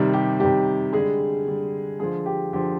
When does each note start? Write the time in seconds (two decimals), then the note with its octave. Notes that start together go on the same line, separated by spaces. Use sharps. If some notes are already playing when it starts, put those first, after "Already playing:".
Already playing: C3 D#3 G3
0.13 G4
0.40 C3 D#3 G3 G4
0.93 D3 G3 G#3 G#4
1.46 D3 G3
1.99 D3 F3 G#3 G#4
2.26 G4
2.53 D3 F3 G4